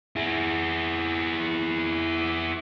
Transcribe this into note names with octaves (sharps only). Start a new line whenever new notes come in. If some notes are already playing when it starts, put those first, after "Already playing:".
E4 G#4